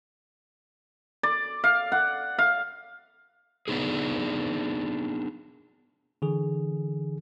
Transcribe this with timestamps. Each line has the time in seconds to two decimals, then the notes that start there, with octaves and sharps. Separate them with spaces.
1.23 D5
1.64 F5
1.92 F#5
2.39 F5
3.68 B3 D4 D#4 G#4
6.22 D3 E3 G#4